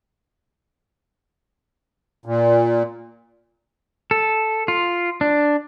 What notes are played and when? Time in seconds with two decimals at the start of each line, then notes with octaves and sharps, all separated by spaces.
2.26 A#2
4.11 A4
4.68 F4
5.21 D4